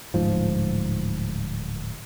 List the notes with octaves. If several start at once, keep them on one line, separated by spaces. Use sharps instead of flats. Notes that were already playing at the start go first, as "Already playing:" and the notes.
D1 G#2 F3